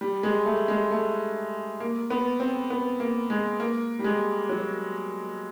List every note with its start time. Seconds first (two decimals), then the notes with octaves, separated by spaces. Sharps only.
0.01 G3
0.23 G#3
0.46 A3
0.68 G#3
0.91 A3
1.80 A#3
2.10 B3
2.40 C4
2.70 B3
3.00 A#3
3.30 G#3
3.60 A#3
3.99 G3
4.04 G#3
4.49 F#3